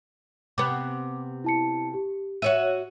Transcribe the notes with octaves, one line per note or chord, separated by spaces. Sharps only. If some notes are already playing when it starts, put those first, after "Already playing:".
C3 B3 D6
E4 A5 C#7
G4
F#4 C#5 E5 D#7